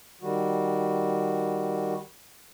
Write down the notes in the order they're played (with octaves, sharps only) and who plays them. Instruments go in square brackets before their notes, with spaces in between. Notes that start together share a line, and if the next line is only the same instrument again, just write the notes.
[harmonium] D#3 G3 F#4